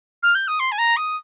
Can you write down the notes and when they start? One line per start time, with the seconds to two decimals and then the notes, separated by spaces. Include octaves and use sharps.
0.23 F6
0.35 G6
0.48 D#6
0.60 C6
0.72 G#5
0.78 A#5
0.97 D#6